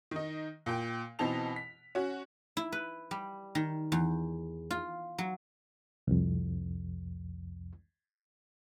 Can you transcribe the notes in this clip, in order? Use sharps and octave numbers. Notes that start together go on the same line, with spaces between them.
D#3 D#4
A#2 G5
B2 E3 C4 D#4 A5 F7
B6
C#4 F#4
E4
B4
G3
D#3
E2
F4
F#3
C2 F2